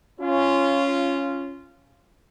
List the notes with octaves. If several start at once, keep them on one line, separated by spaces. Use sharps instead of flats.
C#4 F4